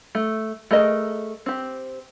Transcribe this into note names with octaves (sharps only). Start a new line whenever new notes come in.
A3
A3 G#4 A#4 D#5
C4 G4